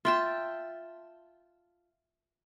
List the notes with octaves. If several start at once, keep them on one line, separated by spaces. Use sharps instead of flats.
F4 E5 G5 A5